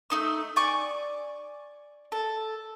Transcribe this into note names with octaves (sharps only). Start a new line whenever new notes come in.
A3 D#4 E6
D5 G#5 C#6 D6
A4